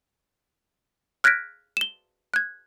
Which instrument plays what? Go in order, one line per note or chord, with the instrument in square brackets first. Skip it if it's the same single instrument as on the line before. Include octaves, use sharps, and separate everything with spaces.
[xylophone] F6 F#6 G#6 A#6 B6 D7
E7 G7
F#6 G#6